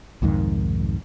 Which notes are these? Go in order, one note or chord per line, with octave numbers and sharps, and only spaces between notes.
C2 F2 G#2 D#3